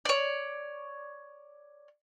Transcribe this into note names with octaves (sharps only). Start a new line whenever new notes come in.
C#5 D5